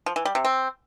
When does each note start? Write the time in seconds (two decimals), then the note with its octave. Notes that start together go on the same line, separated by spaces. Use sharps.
0.06 F3
0.16 E3
0.25 G3
0.35 C3
0.45 C4